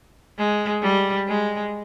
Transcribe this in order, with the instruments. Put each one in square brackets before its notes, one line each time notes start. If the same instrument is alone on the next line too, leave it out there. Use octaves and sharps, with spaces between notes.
[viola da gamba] G#3
G3
G#3